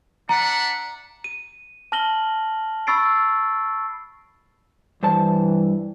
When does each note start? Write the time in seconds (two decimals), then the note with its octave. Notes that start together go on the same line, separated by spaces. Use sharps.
0.29 D4 E5 F#5 A#5
1.24 D#7
1.92 A5 F6 A#6 F#7 G7
2.87 B5 C#6 E6 A6 C7 D7
5.03 G2 E3 C5 A5